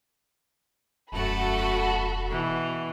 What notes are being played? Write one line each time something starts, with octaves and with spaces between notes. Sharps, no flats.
E1 F#2 A3 F#4 A4 F#5 B5
B2 E3